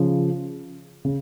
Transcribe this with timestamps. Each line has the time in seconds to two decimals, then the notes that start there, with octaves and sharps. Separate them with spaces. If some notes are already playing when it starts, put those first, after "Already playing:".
Already playing: C#3 F3
1.05 C#3